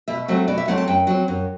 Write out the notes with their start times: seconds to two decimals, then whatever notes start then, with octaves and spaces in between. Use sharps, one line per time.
0.08 B2 E5
0.28 F#3 A3 C4
0.48 B2 D5
0.58 E5
0.68 F#3 A3 C4 F#5
0.78 A5
0.88 F#2 G5
1.07 F#3 C4
1.28 F#2